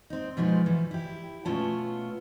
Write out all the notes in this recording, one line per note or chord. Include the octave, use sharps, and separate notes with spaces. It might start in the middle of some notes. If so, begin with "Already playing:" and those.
C4 D#4
B2 F3 G#3 B3 D#4 F4
E3
E4 G4
B2 A3 B3 C#4 F4 A5